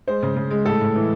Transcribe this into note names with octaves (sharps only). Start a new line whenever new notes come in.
G#3 C5
C#3
C#3
G#3
A2 A4
A2
E3